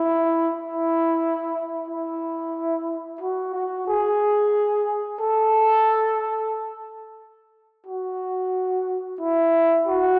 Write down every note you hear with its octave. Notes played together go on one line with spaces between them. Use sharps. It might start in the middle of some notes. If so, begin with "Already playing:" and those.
Already playing: E4
E4
E4
F#4
F#4
G#4
A4
F#4
E4
F#4